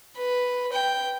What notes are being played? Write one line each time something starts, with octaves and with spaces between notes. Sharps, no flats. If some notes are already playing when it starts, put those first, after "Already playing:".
B4
G5